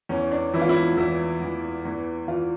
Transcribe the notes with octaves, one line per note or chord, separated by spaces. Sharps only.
E2 E3 C#4
D4
E2 E3 E4
F4
E4
E2 E3 E4
E2 E3
E2 E3
E3 F4